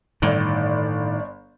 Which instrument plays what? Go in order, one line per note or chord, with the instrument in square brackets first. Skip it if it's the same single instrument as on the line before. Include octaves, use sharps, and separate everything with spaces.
[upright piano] G1 D5 [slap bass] A2 D#3